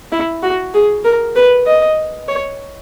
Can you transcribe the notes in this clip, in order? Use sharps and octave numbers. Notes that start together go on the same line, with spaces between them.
E4
F#4
G#4
A#4
B4
D#5
C#5